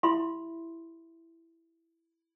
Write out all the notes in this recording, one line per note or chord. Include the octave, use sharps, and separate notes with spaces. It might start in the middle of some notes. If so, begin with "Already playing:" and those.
E4 G4 E5 B5 C6